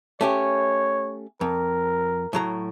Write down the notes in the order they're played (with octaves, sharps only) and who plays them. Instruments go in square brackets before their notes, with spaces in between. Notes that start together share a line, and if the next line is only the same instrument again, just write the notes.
[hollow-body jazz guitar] A3 C#4 G4 [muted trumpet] C#5
[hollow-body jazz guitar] F2 [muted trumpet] A#4
[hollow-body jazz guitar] A2 F#3 A#5